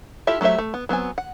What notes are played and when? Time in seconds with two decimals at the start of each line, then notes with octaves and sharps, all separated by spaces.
0.27 E4 F4 G4 A4 E5
0.41 F#3 A3 G4 C5 E5
0.58 A3
0.74 B3
0.89 F#3 B3 C4 G#5
1.18 F#5